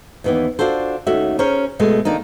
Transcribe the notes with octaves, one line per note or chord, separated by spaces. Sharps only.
D#2 E3 B3
D4 F4 F#4 A4 C5
D#2 A3 C#4 F#4 E5
C#4 G#4 A#4 C5 C#5
B2 G#3 A3
D#3 A#3 D4 D#4